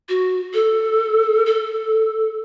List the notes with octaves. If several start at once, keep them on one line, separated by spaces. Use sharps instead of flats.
F#4
A4
A4